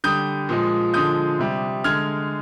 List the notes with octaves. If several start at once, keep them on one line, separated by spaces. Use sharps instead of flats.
D3 G3 D#6 G6
A#2 F3 G#3
D3 F3 G#3 D#6 G6
C3 G3
D3 G#3 F6 G#6